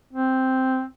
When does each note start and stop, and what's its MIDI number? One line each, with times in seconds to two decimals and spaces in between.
0.13 0.84 60